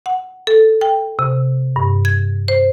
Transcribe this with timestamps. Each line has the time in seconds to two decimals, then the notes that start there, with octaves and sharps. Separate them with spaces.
0.06 F#5
0.47 A4
0.81 G5
1.19 C3
1.76 G2
2.05 G#6
2.48 C5